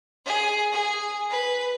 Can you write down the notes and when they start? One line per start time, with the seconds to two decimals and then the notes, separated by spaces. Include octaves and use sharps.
0.25 G#4
0.71 G#4
1.29 B4